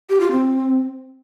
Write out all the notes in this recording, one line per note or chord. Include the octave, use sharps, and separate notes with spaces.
G4
F4
C4